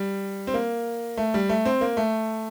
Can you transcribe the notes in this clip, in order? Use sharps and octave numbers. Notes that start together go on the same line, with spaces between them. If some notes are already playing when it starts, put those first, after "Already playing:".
Already playing: G3
C4
A#3
A3
G3
A3
C4
A#3
A3